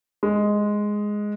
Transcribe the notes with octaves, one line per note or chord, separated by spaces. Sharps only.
G#3